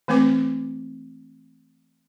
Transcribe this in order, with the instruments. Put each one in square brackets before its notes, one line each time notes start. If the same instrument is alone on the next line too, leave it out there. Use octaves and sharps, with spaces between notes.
[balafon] E3 A3 A#3 C4 B4 D6